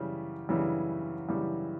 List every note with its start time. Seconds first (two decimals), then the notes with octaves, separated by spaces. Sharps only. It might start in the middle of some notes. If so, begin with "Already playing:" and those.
Already playing: F#2 C#3 E3 G3
0.49 F#2 C#3 E3 G3
1.29 F#2 C#3 E3 G3